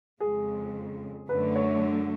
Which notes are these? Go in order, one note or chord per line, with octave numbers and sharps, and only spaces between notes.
F2 C#3 G#3 G#4
F#2 D3 F#3 A3 B4
C#5